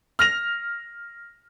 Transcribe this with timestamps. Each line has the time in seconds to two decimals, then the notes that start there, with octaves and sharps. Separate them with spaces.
0.19 F6 A#6 F7